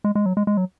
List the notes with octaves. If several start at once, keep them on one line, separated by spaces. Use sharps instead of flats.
G#3
G#3
F#3
G#3
G#3
F#3